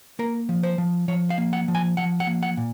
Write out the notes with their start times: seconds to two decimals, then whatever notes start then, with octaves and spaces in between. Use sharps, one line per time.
0.19 A#3 A#4
0.49 F3
0.63 C5
0.78 F3
1.08 F3 C#5
1.30 F5
1.38 A#3
1.53 F#5
1.68 F3
1.75 G#5
1.97 F3 F#5
2.20 F#5
2.27 A#3
2.43 F#5
2.57 A#2